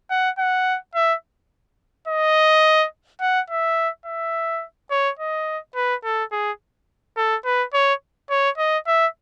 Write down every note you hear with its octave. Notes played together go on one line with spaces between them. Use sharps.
F#5
F#5
E5
D#5
F#5
E5
E5
C#5
D#5
B4
A4
G#4
A4
B4
C#5
C#5
D#5
E5